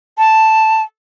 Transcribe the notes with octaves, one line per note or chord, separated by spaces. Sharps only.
A5